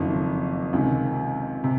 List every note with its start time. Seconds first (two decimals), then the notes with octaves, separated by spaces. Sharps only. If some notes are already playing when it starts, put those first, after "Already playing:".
Already playing: F#1 F2 D#3
0.73 C#2 C3 D#3
1.64 C3